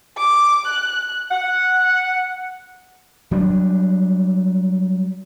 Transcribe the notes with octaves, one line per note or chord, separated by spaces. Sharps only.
D6
F#6
F#5
F#3 G3 A#3 D4